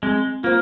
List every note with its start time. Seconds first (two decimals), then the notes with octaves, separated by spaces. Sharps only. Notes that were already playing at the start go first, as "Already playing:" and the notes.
0.03 G#3 C4
0.43 A#3 F4 C5